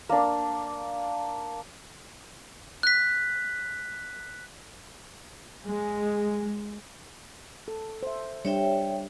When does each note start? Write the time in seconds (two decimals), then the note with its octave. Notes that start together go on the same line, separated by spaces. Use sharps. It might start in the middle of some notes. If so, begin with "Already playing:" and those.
0.09 A#3 D4
2.83 F#6 B6
5.66 G#3
7.68 A4
8.03 C5 E5
8.45 G3 D4 C#5 E5 G5